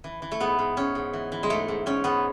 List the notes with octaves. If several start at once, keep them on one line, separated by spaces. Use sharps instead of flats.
E3
E3
A3
G#2 B3
G#2
G#2 C#4
G#2
E3
E3
G#3
G#2 A3
G#2
G#2 C#4
G#2 B3